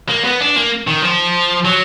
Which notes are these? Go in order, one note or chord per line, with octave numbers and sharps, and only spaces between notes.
A#3
B3
D4
A#3
D#3
F3
F#3